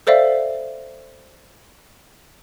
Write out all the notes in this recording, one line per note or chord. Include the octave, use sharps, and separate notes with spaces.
A4 C5 D5 E5 F5